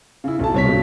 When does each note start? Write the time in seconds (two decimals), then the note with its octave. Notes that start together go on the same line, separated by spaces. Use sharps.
0.24 C#3 E4
0.39 B1 A5
0.54 C2 C#5 B6
0.68 G2 B2